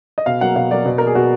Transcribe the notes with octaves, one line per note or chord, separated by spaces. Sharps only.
D#5
B2 F5
F#3 A#3 F#5
B2 F5
F#3 A#3 D5
B2
A#3 A#4
G#4
B2 F#4